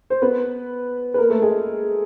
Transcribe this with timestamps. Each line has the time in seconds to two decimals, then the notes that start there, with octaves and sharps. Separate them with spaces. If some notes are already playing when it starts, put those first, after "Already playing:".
0.10 C5
0.22 B3 B4
1.14 B4
1.18 A#3 A#4
1.30 A3 A4
1.42 G#3 G#4